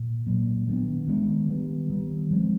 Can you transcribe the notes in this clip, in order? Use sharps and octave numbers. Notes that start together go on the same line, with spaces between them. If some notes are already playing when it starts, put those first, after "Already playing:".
Already playing: A#2
A#2 F#3 A#3
D#3 G#3 B3 D4
D#3 G#3 B3 D4
D#3 G3 B3
D#3 G3 B3
F3 G#3 C4